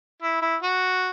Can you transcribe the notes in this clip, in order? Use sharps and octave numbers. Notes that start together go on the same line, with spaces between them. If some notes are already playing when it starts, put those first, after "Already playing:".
E4
E4
F#4